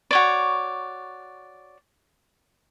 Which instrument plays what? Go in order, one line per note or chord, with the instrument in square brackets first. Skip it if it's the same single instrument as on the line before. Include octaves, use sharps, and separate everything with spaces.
[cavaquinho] F#4 C#5 D5